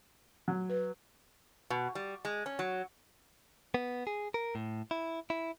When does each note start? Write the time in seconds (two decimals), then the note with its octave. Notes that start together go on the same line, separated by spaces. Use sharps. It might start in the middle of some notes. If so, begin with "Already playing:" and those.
0.48 F#3
0.69 B4
1.70 B2
1.95 G3
2.25 G#3
2.46 C#4
2.59 F#3
3.74 B3
4.07 G#4
4.34 A#4
4.55 A2
4.91 E4
5.30 E4